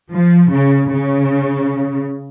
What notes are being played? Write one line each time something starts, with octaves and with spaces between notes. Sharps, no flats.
F3
C#3
C#3